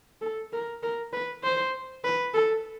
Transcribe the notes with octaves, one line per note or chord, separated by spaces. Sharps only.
A4
A#4
A#4
B4
C5
B4
A4